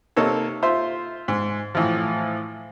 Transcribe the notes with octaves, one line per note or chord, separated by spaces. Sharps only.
C3 A#3 D#4 A4 C#5
F4 C5 E5
G#2
A2 E3 F3